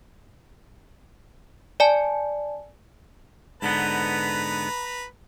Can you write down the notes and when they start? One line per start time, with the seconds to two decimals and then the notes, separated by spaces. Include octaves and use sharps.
1.80 D5 G#5 A5
3.62 G#2 D3 B3 B4 A#5